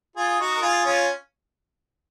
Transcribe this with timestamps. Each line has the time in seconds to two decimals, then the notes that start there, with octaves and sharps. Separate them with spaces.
0.16 F4 G#4
0.39 D#4 F#4
0.57 A#4
0.62 F4 G#4
0.85 C#4 F4